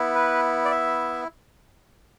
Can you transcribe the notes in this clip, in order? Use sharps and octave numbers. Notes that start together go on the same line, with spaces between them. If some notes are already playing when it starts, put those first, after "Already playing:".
Already playing: B3 E4
B4
D5
E5